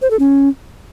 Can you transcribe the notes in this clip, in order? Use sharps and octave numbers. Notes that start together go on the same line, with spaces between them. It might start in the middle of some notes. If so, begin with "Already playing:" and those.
C5
A4
C#4